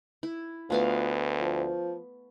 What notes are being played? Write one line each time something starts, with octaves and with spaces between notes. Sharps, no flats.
E4
D2 A3 B3 F4 F5
F3